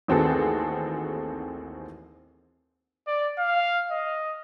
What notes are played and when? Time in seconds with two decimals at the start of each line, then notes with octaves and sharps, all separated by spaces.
0.08 A1 D#2 C4 F#4 G#4 A4
3.07 D5
3.39 F5
3.91 D#5